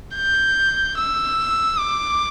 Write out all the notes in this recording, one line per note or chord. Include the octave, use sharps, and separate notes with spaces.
G6
E6
D6